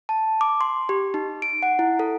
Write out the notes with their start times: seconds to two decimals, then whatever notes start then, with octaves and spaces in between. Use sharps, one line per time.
0.09 A5
0.41 D6
0.61 C6
0.89 G4
1.14 D#4
1.42 D7
1.62 F#5
1.79 E4
1.99 A4